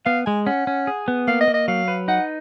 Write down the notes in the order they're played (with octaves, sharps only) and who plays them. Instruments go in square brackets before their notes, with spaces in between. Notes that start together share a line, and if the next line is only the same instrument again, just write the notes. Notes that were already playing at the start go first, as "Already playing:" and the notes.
[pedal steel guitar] B3 [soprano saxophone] F5
[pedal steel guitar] G#3 [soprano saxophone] G#5
[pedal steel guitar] C#4 [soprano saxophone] F#5
[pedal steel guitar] C#4
G#4
B3
[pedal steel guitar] A#3 [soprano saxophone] F5
[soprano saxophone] D#5
[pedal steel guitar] A#3
[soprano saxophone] D#5
[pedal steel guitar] F#3 [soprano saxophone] F5
[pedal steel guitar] B4
[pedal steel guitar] D#4 [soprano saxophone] F#5